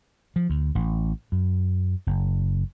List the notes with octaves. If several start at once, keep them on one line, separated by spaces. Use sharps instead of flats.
F3
D2
A1
F#2
F#1